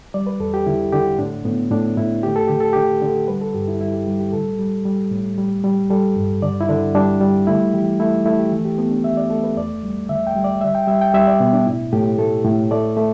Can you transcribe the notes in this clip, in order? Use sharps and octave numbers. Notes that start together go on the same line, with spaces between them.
G3 D5
B4
E2 A4
G4
D3 E4
D3 G4
A2 D4
A2 B3
A2 D4
A2 E4
A3 G4
A4
D3 G4
A4
D3 G4
D3
G3 B4
A4
G2 G4
E4
G3 E4
G4
G3 G4
G4
A2 A4
G3
G3
A2
G3
G3
G3 A4
G2
D3 D5
E4
D3 D4
G3 D4
G3
A3 E4
E3 G4
A3 E4
A3 E4
G4
E3
G4
A3 B3
D4
E3 E5
D5
A3 A4
B4
E2 D5
G3
D3 E5
G5
G3
D5
G3 E5
G5
G3 E5
G5
G3 E5
D5
B2 B3
D4
A2 E4
A2 G4
A3 A4
A2
A3 D5
A3